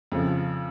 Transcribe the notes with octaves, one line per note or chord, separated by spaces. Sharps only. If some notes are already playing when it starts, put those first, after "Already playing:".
F2 C#3 F3